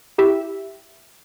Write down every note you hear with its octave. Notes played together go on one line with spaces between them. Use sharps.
E4 G4 E5